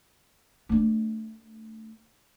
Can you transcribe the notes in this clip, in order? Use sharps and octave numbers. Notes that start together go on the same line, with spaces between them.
A3 D4